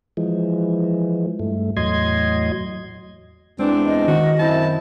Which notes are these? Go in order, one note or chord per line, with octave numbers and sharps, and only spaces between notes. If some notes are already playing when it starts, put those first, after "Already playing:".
E3 F3 G#3
G2 A3
E2 A2 F#3 D#5 C6 G#6
E2 G#3 C4 D4
D#5
D#3 F#4
F#2 C4 E4 A5